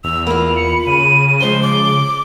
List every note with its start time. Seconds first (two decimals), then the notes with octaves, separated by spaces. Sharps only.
0.04 E2 E6 F7
0.27 A#3 F4 B5
0.56 C#7
0.87 C#3 D#7
1.40 F3 G#3 C5 G7
1.62 D6